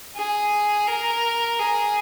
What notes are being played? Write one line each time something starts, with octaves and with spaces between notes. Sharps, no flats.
G#4
A#4
G#4